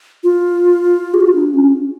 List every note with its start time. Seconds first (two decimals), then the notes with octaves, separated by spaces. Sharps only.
0.24 F4
1.14 G#4
1.20 F#4
1.28 F4
1.35 D4
1.54 C#4